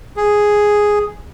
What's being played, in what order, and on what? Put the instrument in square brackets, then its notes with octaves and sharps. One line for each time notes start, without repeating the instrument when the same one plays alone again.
[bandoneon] G#4